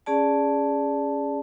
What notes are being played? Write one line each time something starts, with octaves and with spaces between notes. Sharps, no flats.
C#4 G#4 D5 A5